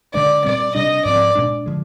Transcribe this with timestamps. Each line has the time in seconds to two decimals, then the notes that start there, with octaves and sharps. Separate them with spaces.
0.14 D3 G#3 D4 D5
0.44 A#2 G3 C4 D5
0.75 C3 G3 D4 D#5
1.05 G#2 F3 C4 D5
1.35 A#2 G#3 D4
1.66 D3 F3 G#3